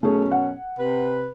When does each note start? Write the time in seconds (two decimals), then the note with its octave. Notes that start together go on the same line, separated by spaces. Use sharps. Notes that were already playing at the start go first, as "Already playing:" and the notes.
0.03 F#2 B2 A3 C#4 G#4
0.32 F#5
0.79 C3 B4